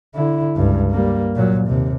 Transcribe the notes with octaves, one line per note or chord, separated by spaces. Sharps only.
D3 E4
C#2 G2
G3 A#3
A#2 F#3
D#2 C3